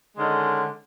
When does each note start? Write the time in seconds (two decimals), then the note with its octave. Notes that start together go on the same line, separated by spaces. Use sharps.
0.17 D3 D#3 G#3 C#4